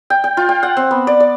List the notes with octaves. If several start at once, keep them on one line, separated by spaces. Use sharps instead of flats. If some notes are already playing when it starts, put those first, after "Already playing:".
G5
G5
F4
G5
F#5
C4
B3
D5
D5